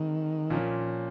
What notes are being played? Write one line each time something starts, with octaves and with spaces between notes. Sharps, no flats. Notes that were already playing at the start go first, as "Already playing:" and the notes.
Already playing: D#3 G#3 C4
A#2 F3 A#3 C#4